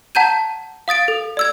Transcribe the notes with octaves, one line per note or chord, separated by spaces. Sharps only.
F#5 A5 A#5 G6 G#6 D#7
F5 D#6 A6 D7
A4
D5 E6 G#6